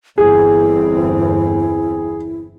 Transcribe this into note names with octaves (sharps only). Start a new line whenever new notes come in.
G1 E2 C4 E4 G#4